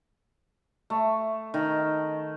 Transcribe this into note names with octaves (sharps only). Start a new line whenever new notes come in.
A3
D#3